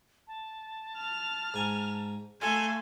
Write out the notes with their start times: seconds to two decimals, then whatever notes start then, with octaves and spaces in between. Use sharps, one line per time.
0.27 A5
0.97 F6
1.54 G#2 G#5
2.41 A3 A4 F5 G#5 C6